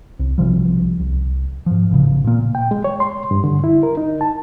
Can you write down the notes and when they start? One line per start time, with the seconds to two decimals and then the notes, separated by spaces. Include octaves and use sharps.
0.19 C2
0.38 B1 C3 F3 G3
1.00 C2
1.66 G#2 F3
1.91 A1 C#3
2.24 A#2 A#3
2.55 G5
2.71 G#3
2.84 C#5
3.00 C6
3.31 G2
3.44 D3
3.64 E4
3.83 A#4
3.97 D#4
4.21 A5